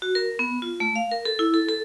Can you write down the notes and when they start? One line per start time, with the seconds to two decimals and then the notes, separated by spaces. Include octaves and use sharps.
0.02 F#4
0.15 A#4
0.39 B3
0.62 F4
0.80 A3
0.96 F5
1.11 A#4
1.25 A4
1.39 E4
1.54 A4
1.69 A4